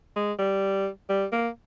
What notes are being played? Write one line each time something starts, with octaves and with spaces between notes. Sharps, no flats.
G#3
G3
G3
A#3